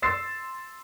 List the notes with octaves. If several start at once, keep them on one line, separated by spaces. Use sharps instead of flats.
C6 E6 A6 C7